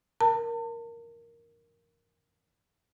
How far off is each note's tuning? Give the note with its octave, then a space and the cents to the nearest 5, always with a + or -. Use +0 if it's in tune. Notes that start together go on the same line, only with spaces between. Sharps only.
A#4 +0 A5 +40